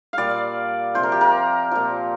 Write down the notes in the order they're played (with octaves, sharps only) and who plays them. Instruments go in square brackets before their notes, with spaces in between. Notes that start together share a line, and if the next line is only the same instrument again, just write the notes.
[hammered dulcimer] A#2 G3 D5 F5
C3 F3 C5
A#4
G4
A#4
A#2 F3